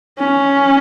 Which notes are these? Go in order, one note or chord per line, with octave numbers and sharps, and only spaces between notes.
C#4